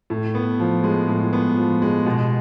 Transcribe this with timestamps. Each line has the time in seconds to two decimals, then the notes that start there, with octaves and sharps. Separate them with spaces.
0.10 A2
0.35 B3
0.59 F3
0.84 G#3
1.08 A2
1.33 B3
1.57 F3
1.82 G#3
2.06 B2